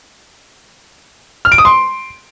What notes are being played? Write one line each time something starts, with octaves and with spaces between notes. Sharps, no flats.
F6
D7
D#6
C6